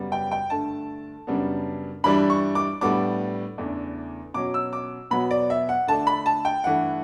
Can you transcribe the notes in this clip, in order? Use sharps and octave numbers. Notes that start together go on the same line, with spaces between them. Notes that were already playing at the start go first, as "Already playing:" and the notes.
Already playing: F#2 C#3 G3 B3
G5
G5
G2 D3 A3 A5
F#2 C#3 G3 B3 D4
G2 E3 G3 D4 B5
C#6
D6
A2 G3 B3 D4 D6
E2 C#3 E3 A3 D4
B2 F#3 C#4 D6
E6
D6
B2 F#3 B3 B5
D5
E5
F#5
D3 A3 D4 A5
B5
A5
G5
G2 E3 A3 F#5